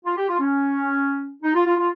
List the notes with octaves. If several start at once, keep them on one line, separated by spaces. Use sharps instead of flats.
F4
G4
F4
C#4
D#4
F4
F4
F4